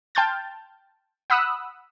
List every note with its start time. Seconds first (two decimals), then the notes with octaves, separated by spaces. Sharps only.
0.15 G5 A5 C6 F6 G6 A6
1.30 F#5 B5 D#6 E6 F#6